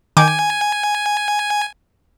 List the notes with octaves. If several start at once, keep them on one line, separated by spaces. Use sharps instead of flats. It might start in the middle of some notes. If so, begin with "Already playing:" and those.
D#3 G5 G#5 D6